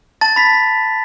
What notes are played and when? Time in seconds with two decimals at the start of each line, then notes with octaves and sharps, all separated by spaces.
0.21 A5 A6
0.36 B5 B6